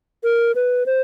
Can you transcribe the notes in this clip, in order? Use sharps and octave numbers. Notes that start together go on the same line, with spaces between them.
A#4
B4
C5